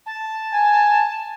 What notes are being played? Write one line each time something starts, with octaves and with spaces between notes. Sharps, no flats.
A5
G#5